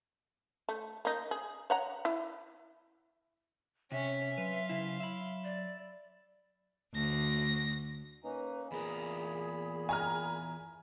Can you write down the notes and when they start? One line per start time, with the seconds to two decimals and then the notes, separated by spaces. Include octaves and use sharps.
0.69 A3
1.05 A#3 D#4
1.31 G#4
1.70 C#5 F#5 A#5
2.05 E4
3.92 C3 C#4 E5
4.38 F#3 B4 F5 C6
4.70 C#3 E4
5.00 E5 B5
5.44 D5
6.94 D2 A#6
8.24 A#3 C#4 D#4 B4
8.72 E2 A#2 G#4 A#4 B5
9.89 G#5 A#5 F6